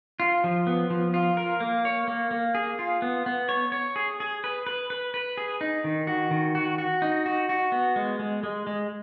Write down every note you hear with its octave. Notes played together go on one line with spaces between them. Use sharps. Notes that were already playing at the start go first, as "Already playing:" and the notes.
F4
F3
B3
F3
F4
A#4
A#3
C#5
A#3
A#3
G#4
F4
B3
B3
C#5
C#5
G#4
G#4
B4
B4
B4
B4
G#4
D#4
D#3
F#4
D#3
F#4
F#4
D#4
F#4
F#4
B3
G#3
G#3
G#3
G#3